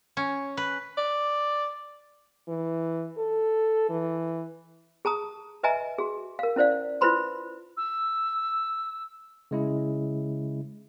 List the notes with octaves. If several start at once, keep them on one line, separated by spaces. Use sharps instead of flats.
C#4
B4
D5
E3
A4
E3
G#4 A5 A#5 D#6
B4 D#5 E5 G#5 A#5
F#4 G#4
A#4 F5
C#4 E4 C5 D5 F5
E4 F4 B4 C5 B5 C6
E6
C#3 G#3 E4